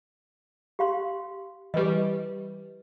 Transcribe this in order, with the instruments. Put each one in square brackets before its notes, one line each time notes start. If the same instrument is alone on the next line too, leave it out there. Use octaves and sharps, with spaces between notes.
[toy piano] G4 F5 C6
[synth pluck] E3 G3 [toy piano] G4 B4 D#5